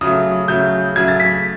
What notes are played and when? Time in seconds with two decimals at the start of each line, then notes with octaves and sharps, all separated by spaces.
0.01 C#3 F#3 A3 D#6
0.48 C#3 F#3 A3 G6
0.96 C#3 F#3 A3 G#6
1.08 A6
1.20 B6